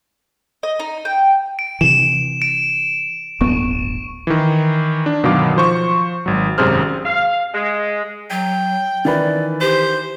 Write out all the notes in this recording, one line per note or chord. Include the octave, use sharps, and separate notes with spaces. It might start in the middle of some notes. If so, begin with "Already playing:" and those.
D#5
D#4
G5
D7
C3 E3 E7
D7
D1 G1 B3 C#6
D#3 E3
D4
G1 B2 D#3 F#3 F5 D6
F3 C5 C#6
G#1 F#3
G#1 F#2 C3 G#4 C5 F6
F5
G#3
F#3 G5
D#3 E3 B4 D5
G4 C5